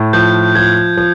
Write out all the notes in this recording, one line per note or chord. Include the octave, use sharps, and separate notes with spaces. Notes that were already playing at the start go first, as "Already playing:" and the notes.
Already playing: A2
F3 G6
F3 G#6
F3